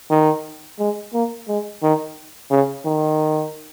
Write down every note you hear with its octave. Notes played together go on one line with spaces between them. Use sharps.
D#3
G#3
A#3
G#3
D#3
C#3
D#3